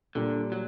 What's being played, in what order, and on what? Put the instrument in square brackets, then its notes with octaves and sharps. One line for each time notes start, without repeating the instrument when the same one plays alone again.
[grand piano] A#2 G3 A#3 [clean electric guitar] D3
[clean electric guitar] F#3